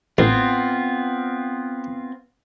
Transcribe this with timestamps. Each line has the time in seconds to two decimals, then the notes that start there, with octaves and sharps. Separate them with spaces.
0.18 A1 B3 C4 F4